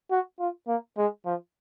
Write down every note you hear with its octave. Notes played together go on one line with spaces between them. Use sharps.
F#4
F4
A#3
G#3
F3